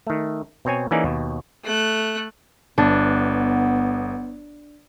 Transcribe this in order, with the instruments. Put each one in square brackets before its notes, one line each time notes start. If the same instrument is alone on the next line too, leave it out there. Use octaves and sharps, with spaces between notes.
[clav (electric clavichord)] D#3 A3
B2 C4 C#5 G#5
E3 A#3 C#4 D#4 G#4 D5
D#2 B2
[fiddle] A3 F#6
[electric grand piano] G1 [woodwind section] B3 [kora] D4